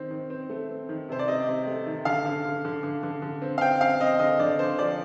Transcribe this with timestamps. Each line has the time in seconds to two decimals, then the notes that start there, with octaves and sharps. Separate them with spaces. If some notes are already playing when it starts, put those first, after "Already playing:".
Already playing: D#3 C4
0.11 D#3
0.30 C4
0.50 A3
0.70 C4
0.89 D#3
1.09 C3 C5
1.19 D5
1.28 C3 D#5
1.48 C3
1.67 A3
1.86 D#3
2.05 D3 F5
2.25 D3
2.45 D3
2.65 D3
2.83 D3
3.03 D3
3.22 D3
3.42 C4
3.58 F5
3.61 C4 G5
3.81 C4 F5
4.00 C4 D#5
4.19 D3 D#5
4.39 D3 D5
4.59 C4 C5
4.78 F3 D5